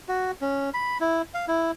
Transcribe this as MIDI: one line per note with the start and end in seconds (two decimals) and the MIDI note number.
0.08 0.31 66
0.41 0.70 61
0.74 0.98 83
1.01 1.22 64
1.34 1.46 77
1.48 1.71 64